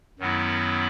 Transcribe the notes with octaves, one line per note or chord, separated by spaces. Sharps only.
F#2 D#3 F#3 B3 E4